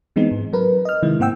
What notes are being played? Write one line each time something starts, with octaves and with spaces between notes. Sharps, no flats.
E3 G#3 B3 C4 D#4
G#2
F#3 A#4 B4
D#5 F6
C3 D#3 G#3 E4
G#2 A#3 C4 F#5 G5 E6